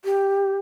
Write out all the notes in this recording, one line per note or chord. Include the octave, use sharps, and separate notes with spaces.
G4